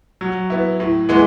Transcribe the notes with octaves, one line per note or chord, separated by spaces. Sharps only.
F#3
B3 E4
A2
E3 G#3 B3